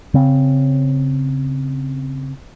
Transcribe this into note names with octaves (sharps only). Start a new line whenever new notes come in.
C#3 C4